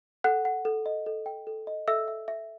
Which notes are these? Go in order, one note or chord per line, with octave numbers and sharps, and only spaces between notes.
A4 F#5 F#6
F#5
A4
D#5
A4
G5
A4
D#5
A4 E5 E6
E5
E5